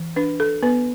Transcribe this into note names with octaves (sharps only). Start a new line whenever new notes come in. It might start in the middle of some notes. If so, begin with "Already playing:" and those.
Already playing: E3
D4 B4
A4
B3 B4